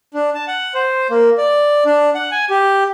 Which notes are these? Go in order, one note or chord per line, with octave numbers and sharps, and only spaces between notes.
D4
A5
F#5
C5
A#3
D5
D4
F#5
G#5
G4